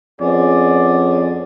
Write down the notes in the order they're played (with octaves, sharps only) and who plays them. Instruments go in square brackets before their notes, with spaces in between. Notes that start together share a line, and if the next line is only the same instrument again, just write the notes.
[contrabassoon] F2 [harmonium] B3 C#4 G#4 [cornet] D5